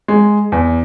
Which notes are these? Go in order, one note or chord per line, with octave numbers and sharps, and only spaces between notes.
G#3
E2